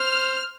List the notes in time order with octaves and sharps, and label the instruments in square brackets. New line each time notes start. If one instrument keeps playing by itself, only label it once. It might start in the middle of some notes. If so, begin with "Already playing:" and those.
Already playing: [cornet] C5 [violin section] F6